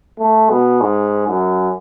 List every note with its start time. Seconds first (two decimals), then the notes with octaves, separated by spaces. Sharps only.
0.19 A3
0.50 B2
0.81 G#2
1.27 F#2